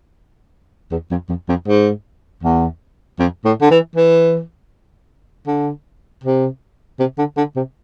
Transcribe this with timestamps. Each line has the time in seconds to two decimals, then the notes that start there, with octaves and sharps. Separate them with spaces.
0.91 E2
1.11 F2
1.29 F2
1.49 F2
1.68 G#2
2.43 E2
3.19 F2
3.45 A2
3.61 D3
3.71 E3
3.96 E3
5.47 D3
6.24 C3
6.99 C3
7.18 D3
7.37 D3
7.56 C3